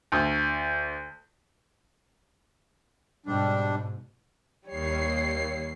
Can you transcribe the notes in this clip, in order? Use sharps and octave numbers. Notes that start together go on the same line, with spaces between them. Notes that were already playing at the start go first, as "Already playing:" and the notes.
D2
G#2 B2 G3 D4
D#2 G3 C#5 C7